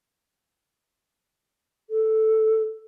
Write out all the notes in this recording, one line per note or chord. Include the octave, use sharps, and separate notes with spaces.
A4